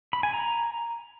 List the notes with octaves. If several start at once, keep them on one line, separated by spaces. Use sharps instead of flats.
B5
G#5
A#5